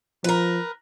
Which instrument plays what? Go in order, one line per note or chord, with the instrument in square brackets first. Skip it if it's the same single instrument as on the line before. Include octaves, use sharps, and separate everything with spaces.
[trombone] F3 [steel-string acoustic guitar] A#4 B4